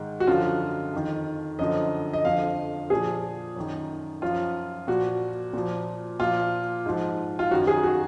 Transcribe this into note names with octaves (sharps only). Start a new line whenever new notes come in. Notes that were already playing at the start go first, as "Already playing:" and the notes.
Already playing: G#2 D#3
F#4
F#2 D3 F3 F4
F2 D#3
F#2 D3 F3 D#5
D#5
F2 D3 F3 F5
A#2 F3 G#4
F#2 D#3
F#2 F3 F4
A#2 F3 F#4
A#2 F3
A#2 F3 F4
G#2 F3
F4
F#2 D#3 F#4
G#4
F#4